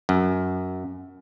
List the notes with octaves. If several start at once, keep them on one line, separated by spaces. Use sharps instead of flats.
F#2